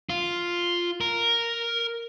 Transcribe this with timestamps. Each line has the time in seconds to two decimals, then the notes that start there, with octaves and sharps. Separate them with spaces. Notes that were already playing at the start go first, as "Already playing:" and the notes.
0.10 F4
1.01 A#4